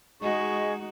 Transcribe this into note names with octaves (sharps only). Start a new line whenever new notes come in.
G#3 D#4 F#4 G#4 D#5 C#6